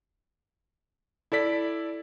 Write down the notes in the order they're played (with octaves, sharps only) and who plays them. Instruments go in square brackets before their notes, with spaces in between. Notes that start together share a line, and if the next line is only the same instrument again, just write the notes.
[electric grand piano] E4 A4 D5 B6